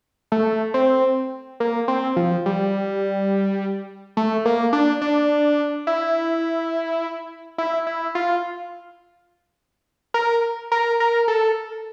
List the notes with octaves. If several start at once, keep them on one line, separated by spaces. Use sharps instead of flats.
A3
C4
A#3
C4
F3
G3
A3
A#3
D4
D4
E4
E4
E4
F4
A#4
A#4
A#4
A4